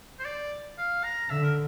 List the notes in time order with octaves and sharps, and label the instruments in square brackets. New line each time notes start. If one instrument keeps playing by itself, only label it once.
[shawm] C5
D5
F5
A#5
[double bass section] D3 [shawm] E5
[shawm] A#4